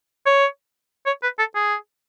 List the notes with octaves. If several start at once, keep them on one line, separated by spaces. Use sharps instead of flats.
C#5
C#5
B4
A4
G#4